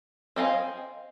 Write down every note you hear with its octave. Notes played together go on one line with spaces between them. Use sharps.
C4 D#5 F5 G#5